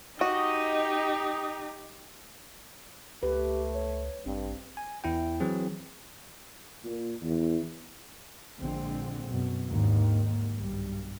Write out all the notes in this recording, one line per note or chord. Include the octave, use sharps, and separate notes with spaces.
D#4 F#4 G4 D#5
C#2 A3 G4 B4
C#5
A1 G2 C4
G#5
E2 E4 G5
E3 F#3 C4 G#4
A#2
E2
A#1 A#2 D3 G#3 C4
F#2 B2
G#1 D#2 G#2 D3 D#3 A#3
B1 G2 G3